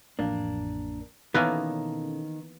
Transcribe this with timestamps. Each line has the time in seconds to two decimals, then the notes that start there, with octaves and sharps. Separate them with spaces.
0.19 A1 F2 A#3 D4
1.34 B2 D#3 E3 A#3 B3 C#4 A4